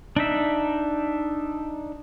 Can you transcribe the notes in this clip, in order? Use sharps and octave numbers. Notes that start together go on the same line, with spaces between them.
D4 D#4 E5